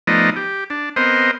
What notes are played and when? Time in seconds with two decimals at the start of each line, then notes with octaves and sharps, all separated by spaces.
0.07 F3 A3 B3 D#4 D5 D#5
0.36 G4
0.70 D4
0.96 B3 C4 A#4 C5 D#5